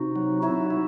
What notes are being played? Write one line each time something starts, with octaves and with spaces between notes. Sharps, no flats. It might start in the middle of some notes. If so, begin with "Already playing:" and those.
Already playing: C3 D#4 F#4
F#3
D#4 E4 F#4
E4